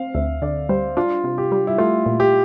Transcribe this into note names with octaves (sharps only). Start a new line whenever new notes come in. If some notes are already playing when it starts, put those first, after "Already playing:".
Already playing: C4 F5
D2 E5
D3 D5
G3 C5
D4 F4
C3
G4
G3
E4
A3 F4
A#2
G4